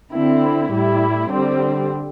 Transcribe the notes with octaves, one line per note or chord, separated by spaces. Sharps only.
D3 C4 E4
A2 G3 E4
D3 G3 C4